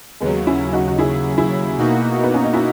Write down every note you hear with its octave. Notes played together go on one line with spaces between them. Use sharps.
D#2 C#3 F#3 G#3 B3
C#4 E4
D#4 F#4
F#4
E4 G#4
E4 G#4
B2 A#3 D#4 F#4
B3
C#4
D#4
C#4 E4